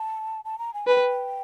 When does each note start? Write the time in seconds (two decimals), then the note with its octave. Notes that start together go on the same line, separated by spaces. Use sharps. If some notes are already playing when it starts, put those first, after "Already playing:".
Already playing: A5
0.45 A5
0.59 A#5
0.74 G#5
0.87 B4 G#5
0.92 G5